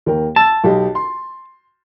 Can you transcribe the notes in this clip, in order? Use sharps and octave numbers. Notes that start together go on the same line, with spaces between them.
D#2 A#4 G5
A5 E6 A6
B1 G4 D#5
C6